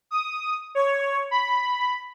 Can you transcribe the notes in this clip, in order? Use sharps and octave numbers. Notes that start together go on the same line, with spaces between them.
D#6
C#5
B5